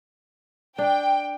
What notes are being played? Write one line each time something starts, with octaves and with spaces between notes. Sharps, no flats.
D4 G5